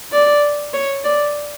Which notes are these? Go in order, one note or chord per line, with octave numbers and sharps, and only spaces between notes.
D5
C#5
D5